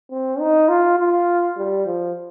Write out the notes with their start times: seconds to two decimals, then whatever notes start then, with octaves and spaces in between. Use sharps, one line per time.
0.11 C4
0.40 D#4
0.69 F4
0.98 F4
1.57 G3
1.86 F3